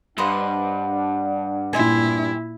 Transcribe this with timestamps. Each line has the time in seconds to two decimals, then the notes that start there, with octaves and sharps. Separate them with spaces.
0.18 G2 D4 B4 C5 D#5 F#5
1.73 A#2 E4 G4 C5 G#5